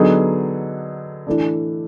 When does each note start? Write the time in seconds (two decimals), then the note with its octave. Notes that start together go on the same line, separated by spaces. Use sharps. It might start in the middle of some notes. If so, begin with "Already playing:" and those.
Already playing: D3 F#3 B3 D#4 G#4
1.27 E3 A3 D4